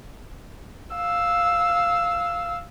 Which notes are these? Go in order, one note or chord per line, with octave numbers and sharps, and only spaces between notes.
F5 E6